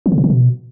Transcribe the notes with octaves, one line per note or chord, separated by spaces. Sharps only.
E3
C#3
C3
D3
B2